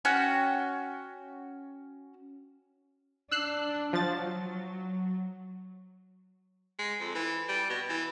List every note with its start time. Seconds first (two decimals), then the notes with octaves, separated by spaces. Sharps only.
0.05 C#4 F#4 G5 F#6
3.31 D4 E6 F#6 C7
3.93 F3 F#3 A6
6.79 G#3
7.00 F2
7.15 E3
7.49 G3
7.70 B2
7.89 E3